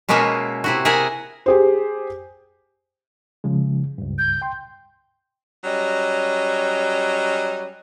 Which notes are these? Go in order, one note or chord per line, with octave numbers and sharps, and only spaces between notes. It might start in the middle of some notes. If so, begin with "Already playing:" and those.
B2 G#3 A#3 B3 C#4 E5
C3 E4 F#4
G#4 A#4 E5 F#5 G#5
G4 G#4 C5
C#3 F3 G#3
C#2 G2
G6
G5 C6
F#3 G3 C#4 D#5